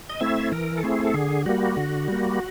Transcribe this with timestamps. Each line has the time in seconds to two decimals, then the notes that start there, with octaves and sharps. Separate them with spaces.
0.09 D#5
0.20 A3 C4 E4 E5
0.52 E3 A#4
0.77 A4
0.83 A3 C4 E4 G#4
1.05 A4
1.14 D3 G#4
1.46 G3 A#3 F#4
1.77 D3
2.08 G3 A#3